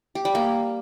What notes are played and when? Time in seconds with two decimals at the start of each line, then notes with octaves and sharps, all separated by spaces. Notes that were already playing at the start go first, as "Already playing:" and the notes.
0.15 G4
0.25 G3
0.35 A#3